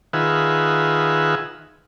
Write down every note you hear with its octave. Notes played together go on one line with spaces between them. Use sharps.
D#3 F4 G#4 B4 E5 F#5